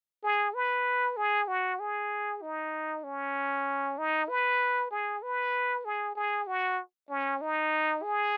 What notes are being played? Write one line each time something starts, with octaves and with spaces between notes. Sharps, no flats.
G#4
B4
G#4
F#4
G#4
D#4
C#4
D#4
B4
G#4
B4
G#4
G#4
F#4
C#4
D#4
G#4